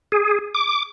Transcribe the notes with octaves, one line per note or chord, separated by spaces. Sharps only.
G#4
D6